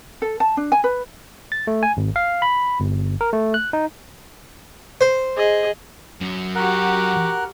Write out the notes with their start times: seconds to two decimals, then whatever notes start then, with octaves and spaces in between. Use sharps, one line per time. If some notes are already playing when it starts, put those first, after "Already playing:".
0.22 A4
0.40 A5
0.57 D4
0.72 G#5
0.84 B4
1.52 A6
1.67 A3
1.83 G#5
1.97 G#1
2.16 F5
2.42 B5
2.80 G1
3.21 A#4
3.33 A3
3.54 F#6
3.73 D#4
5.01 C5
5.36 G#4 D#5
6.21 F#2 F#3
6.55 F#4 G4 A#4 F#5